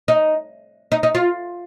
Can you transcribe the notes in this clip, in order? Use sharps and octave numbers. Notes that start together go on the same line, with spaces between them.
D#4
D#4
D#4
F4